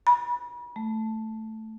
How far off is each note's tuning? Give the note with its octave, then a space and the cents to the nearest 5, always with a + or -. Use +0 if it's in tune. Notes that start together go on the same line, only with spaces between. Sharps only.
B5 -40
A3 +0